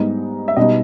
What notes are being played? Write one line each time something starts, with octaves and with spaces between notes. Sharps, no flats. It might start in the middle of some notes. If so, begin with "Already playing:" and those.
Already playing: G#2 G3 B3 D#4
E5
B2 G3 B3 D#4 D#5